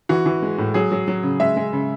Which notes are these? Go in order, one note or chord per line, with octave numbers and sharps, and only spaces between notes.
E3 F#4
E3
G#3
A2
F#3 G#4
F#3
F#3
C#3
G#3 E5
G#3
C#3